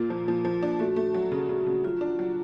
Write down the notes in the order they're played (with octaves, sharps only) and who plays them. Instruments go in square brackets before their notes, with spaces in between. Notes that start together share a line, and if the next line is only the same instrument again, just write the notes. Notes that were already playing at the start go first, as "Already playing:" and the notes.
Already playing: [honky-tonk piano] A#2 A#3 [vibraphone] F4
[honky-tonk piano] F3
F3
F3
D4
[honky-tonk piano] A3 [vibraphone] F#4
[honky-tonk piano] A3
F#3
C#3
C#3
C#3
[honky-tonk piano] F#3 [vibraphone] F4
[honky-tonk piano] D4
F#3